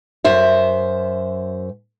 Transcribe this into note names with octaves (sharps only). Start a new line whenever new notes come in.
F#2 C5 E5